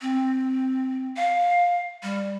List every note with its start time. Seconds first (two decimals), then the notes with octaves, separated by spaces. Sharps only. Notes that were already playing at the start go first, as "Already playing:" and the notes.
0.01 C4
1.17 F5
2.03 G3